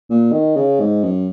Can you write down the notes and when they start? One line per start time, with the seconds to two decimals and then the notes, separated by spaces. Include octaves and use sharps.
0.10 A#2
0.32 D#3
0.57 C#3
0.80 G#2
1.04 F#2